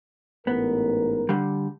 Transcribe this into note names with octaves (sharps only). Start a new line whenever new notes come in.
A1 G#2 B3 A#4
D3 G3